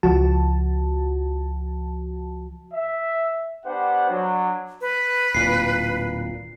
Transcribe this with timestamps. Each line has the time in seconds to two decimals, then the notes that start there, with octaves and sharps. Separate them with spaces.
0.03 C#2 F3 F#4 A5
2.74 E5
3.65 B3 D4 G4 C5 F#5
4.09 F#3 D4
4.81 B4
5.35 D1 A#2 C7